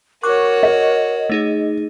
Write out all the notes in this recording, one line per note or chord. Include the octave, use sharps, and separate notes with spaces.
F#4 A#4 C#5 C#6 D6 F#6
D#5
A3 D#4 G#4